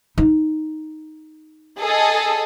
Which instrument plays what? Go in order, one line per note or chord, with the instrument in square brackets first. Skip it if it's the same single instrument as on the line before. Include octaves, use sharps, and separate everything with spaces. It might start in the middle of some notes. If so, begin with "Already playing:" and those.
[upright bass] D#4
[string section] G#4 A4 D#5